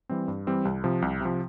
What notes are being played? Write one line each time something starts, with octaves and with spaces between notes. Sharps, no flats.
E3 G3 C4
G2
E3 G3 C4
C2
C3 F3
C2
C3 F3